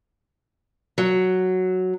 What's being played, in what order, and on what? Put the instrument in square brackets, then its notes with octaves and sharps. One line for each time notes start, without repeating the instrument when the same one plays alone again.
[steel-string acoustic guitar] F#3